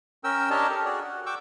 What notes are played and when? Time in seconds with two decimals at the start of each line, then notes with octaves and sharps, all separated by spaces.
0.24 C#4 A#4 G5 E6
0.50 D4 G4 A#4 C#5 D#5 A5
0.70 A4 A#4
0.85 F#4 G#4 D5
1.04 F#5
1.26 F#5 G5 C#6 D6 E6